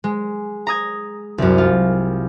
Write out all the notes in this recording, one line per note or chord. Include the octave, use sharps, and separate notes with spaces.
G#3
A#5 D#6 G#6
C2 F#2
F4